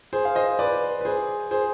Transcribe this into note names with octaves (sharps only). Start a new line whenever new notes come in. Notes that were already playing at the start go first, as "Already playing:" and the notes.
G#4 C5
F5
C5 D#5
B4 D5
B4
G#4 C5
G#4 C5